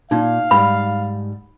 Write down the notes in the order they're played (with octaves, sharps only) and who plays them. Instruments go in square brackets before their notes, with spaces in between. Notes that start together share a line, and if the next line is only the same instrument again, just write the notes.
[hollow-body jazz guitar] A#2 [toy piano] D#4 [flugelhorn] F5
[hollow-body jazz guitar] G#2 G3 [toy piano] B5